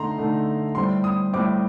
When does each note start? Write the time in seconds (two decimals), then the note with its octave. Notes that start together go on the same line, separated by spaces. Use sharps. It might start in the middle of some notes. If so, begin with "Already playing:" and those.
Already playing: D3 A3 D#4 A#5 C6
0.18 D3 A3 D#4
0.75 A2 G3 C4 C6
1.04 D#6
1.33 A2 G3 C4 D6